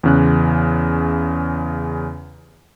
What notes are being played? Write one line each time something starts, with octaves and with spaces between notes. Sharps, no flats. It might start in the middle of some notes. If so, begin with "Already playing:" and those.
E2 C#3 F#6